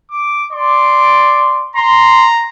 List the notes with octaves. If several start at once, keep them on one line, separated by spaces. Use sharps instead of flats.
D6
D5 C6 D6
A#5 C6